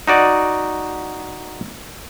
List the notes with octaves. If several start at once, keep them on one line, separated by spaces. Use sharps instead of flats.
D#4 F#4 D5